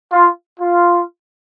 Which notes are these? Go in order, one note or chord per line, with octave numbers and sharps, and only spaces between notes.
F4
F4